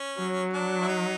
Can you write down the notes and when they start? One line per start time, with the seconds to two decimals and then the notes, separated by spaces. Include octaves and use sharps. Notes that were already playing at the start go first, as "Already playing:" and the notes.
Already playing: C#4
0.19 F#3
0.53 D4
0.82 E4
0.88 D#4